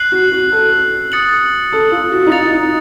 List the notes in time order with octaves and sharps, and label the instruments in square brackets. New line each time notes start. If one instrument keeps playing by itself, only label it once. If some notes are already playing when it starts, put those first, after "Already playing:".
Already playing: [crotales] F#6 C7 F#7
[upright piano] F#4
F#4
A4
[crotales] D#6 A6 C#7 F#7
[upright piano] A4
F4
F#4
D#4
[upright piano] F4 [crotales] A6 C#7 F7
[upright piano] D#4